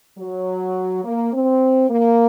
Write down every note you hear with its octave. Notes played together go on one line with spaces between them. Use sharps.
F#3
A#3
C4
A#3